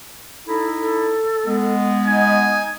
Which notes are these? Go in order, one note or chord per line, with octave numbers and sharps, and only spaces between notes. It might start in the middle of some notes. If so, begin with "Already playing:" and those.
D#4 E4 A4
A4
G#3 B3
D#4 G#5